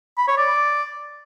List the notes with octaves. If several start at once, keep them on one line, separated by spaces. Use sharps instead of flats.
B5
C#5
D5